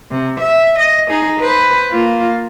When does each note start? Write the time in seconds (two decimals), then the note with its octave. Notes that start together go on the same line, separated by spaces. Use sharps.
0.11 C3
0.40 E5
0.79 D#5
1.10 D#4 G#4
1.40 B4 C5
1.91 A#3 F4